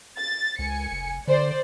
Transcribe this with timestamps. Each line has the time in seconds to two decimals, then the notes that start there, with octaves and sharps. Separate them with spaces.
0.18 A6
0.59 C#2 G#5 C#7
0.91 F1
1.27 D3 C5 D5